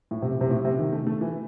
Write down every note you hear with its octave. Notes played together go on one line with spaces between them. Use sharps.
A2
C3
C3
A2
C3
D#3
A3
A3
E3